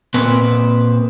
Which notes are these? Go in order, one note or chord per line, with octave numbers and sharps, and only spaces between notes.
A#2 C4 B4